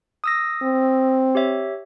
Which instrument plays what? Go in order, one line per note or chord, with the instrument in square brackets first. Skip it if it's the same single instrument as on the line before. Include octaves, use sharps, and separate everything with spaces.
[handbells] D#6 E6 A#6
[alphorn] C4
[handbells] G4 C#5 E5